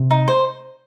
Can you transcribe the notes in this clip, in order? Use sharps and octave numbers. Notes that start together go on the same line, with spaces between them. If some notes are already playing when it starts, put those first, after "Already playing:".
Already playing: C3
D#4
C5